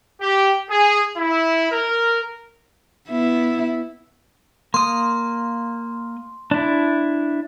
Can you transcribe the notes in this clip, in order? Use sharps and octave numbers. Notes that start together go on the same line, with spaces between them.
G4
G#4
E4
A#4
B3 E4
A#3 C6 D#6
D4 E4